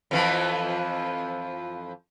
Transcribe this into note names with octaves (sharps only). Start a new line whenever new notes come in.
F2 E3 F3